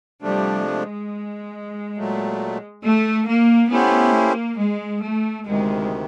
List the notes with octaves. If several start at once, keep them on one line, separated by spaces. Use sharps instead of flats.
C3 F3 G3 A3 D4
G#3
A#2 F#3 A3
A3
A#3
A3 B3 C#4 E4 G4 C5
A#3
G#3
A3
D2 C3 D#3 G#3